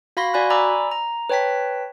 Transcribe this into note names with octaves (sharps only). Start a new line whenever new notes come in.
F#4 F5 B5 C6 A#6
F#4 D5 G#5 B5 F#6
D5 G#5 A#5 B5 D6 E6
A#5
B4 C#5 G5 A5 B6